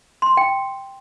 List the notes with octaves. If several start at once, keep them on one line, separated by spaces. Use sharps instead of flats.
C6
G5